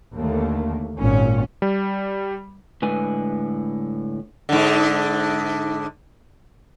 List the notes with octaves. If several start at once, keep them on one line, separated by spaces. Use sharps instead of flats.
D#2 D3 A3 A#3
G#1 A#2 C#4
G3
A2 D3 G#3 B4 G#5
G#2 D3